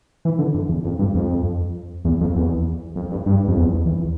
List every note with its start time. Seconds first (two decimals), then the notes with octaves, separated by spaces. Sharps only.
0.25 E3
0.39 D3
0.55 F2
0.69 E2
0.85 F2
0.99 G2
1.15 F2
2.05 E2
2.21 F2
2.36 E2
2.96 F2
3.11 G2
3.26 G2
3.48 F2
3.57 E2
3.85 E2